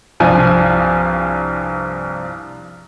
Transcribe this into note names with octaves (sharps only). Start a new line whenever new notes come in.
C2 G2 F3 G#5